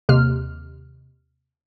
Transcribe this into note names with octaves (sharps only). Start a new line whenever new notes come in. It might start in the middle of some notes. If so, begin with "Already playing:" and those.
D#2 C3 F6